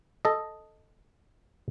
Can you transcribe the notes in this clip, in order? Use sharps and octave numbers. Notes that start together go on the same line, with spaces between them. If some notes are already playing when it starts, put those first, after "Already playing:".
A4 D#5